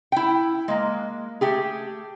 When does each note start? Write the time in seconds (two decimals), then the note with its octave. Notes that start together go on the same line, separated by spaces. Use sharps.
0.12 E4 G5
0.68 G#3 A#3
1.41 A3 G4 G#4